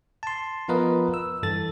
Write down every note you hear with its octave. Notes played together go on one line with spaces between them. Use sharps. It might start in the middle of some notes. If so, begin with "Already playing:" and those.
A5 C6
F3 B3 F4 A#4 B4 D#5
E6
G2 E3 A4 A6